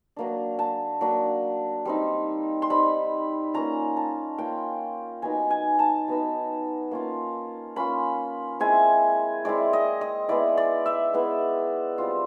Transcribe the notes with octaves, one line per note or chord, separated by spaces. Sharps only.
F#3 A#3 D4
A5
F#3 A#3 D4
G3 C4 D#4
C6
G3 C4 D#4 B5
A#3 C#4 F4 A#5
A5
A#3 C#4 F4 G5
F#3 B3 D#4 G#5
G#5
A5
F#3 B3 D#4
A#3 C#4 F4
A#3 C#4 F4 B5
G#3 C4 E4 G#5
G#3 C4 E4 D5
D#5
D#5
G#3 B3 E4 D5
D5
E5
G#3 B3 E4
G3 C4 F4